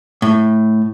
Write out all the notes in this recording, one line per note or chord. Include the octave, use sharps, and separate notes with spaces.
A2